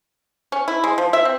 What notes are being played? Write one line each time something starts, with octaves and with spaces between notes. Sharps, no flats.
C#4
E4
G#3
F3
E5
C4